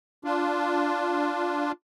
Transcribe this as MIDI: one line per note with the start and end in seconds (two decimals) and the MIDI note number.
0.24 1.72 62
0.24 1.72 65